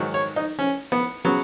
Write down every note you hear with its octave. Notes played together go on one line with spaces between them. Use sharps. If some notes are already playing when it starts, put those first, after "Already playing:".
Already playing: G#2 D#3 F#3
C#5
D#4
C#4
B3
C#3 F#3 B3